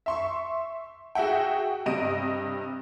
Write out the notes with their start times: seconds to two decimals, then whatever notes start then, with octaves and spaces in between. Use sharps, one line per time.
0.06 E5 C6 C#6
1.15 F#4 G#4 E5 F#5 G5
1.86 G2 C3 D#5 D7 D#7